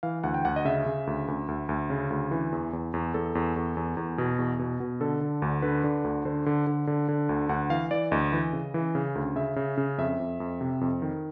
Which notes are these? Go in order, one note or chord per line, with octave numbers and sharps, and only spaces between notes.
E3 F5
D2 F#5
G5
D2 F#5
D#5
C#3 E5
C#3
D2
D2
D2
D2
C#3
D2
E3
E2
E2
E2
E2 A4
E2
E2
E2
E2
B2
E2
B2
B2
D3 A4
D3
D2
D3 B4
D3
D2
D3 C5
D3
D3
D3
D3
D2
D2 F#5
E3 F5
E3 D5
D2 D#5
E3
C#3
E3
C#3
D2
C#3 E5
C#3
C#3
F2 E5
F2
F2
C3
F2
D#3